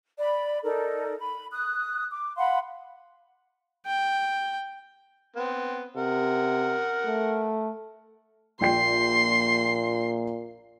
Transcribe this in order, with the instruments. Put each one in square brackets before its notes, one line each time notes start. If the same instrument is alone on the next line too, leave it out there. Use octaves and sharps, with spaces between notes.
[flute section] D5 B5
D#4 A4 A#4 D5
B5
D#6 F#6
D6
F5 F#5 B5 C6
[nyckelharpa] G5
[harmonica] B3 C4
[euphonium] C3 [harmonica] A#4 F#5
[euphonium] A3
[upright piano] A#1 G5 C7 [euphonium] A#2 [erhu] C6